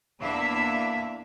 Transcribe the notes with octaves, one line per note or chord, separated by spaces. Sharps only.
E2 A#3 D4 E4 E5 F5